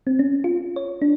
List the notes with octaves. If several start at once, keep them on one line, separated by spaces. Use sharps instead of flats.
C4
C#4
F4
C#5
D4